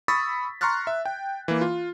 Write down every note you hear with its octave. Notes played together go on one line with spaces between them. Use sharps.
B5 C#6 D#6 E6 A6 B6
A#5 C6 C#6 F6 F#6 A6
E5
G5
E3 A#3
F4